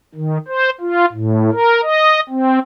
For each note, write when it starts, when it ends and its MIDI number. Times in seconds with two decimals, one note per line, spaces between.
0.15 0.38 51
0.48 0.70 72
0.81 1.05 65
1.12 1.50 45
1.52 1.81 70
1.83 2.20 75
2.29 2.59 60